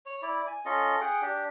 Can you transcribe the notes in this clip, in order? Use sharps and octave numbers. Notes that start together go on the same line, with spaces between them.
C#5
E4 D5
G#5
C#4 F4 A4 D#5
G#4 F#5 G5
D4 G4